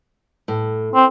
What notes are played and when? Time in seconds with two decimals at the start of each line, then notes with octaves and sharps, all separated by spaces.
0.48 A2
0.95 C4